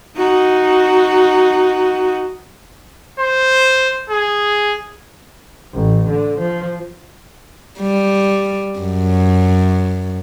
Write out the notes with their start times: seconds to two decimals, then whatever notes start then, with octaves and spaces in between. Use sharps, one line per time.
0.17 D#4 F#4
3.20 C5
4.10 G#4
5.73 A1
6.08 D3
6.40 F3
7.80 G3
8.79 F#2